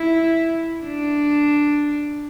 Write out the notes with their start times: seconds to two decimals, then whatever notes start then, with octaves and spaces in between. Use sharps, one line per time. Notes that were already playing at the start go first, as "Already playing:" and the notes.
Already playing: E4
0.84 D4